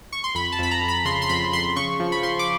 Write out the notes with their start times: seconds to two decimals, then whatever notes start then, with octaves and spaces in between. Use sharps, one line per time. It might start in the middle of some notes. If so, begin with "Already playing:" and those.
0.12 C#6
0.24 C6
0.35 F2 B5
0.52 A5
0.59 F2 B5
0.71 A#5
0.82 F2
0.88 B5
1.05 C#3 C6
1.22 C6
1.29 F2 B5
1.53 F2 C6
1.76 C#3 C#6
2.00 F3
2.12 B5
2.23 F3 C6
2.39 D6